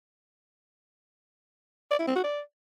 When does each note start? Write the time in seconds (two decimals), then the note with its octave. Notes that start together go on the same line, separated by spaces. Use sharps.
1.91 D5
1.99 E4
2.07 C4
2.16 F#4
2.24 D5